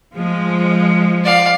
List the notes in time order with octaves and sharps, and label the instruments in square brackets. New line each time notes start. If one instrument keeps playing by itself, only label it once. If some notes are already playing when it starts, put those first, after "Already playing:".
[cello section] F3 G#3
[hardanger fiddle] D5 F5